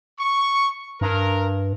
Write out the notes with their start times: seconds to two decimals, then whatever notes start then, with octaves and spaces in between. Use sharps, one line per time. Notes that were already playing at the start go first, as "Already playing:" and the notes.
0.19 C#6
1.01 G2 A#4